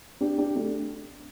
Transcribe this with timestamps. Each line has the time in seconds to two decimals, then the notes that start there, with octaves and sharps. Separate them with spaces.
0.21 D4 G4
0.38 D4 G4
0.55 A3 D4